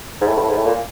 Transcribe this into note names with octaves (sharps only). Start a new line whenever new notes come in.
G#2
A2
G2
A2
G#2
A2
A#2